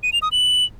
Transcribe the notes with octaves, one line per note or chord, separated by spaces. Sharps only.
D#7
F7
D#6
F#7